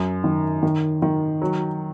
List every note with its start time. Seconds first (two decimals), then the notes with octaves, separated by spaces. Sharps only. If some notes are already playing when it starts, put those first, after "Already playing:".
Already playing: F#2
0.24 D#3
0.63 D#3
1.02 D#3
1.42 F#3